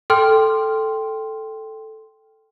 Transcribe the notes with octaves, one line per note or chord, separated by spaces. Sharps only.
A4 G5 C6 F6